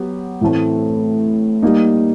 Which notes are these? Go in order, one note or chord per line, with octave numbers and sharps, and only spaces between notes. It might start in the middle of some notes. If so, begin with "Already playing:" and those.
Already playing: F#3 B3 G4
A2 E3 A3 C4
G3 A#3 D#4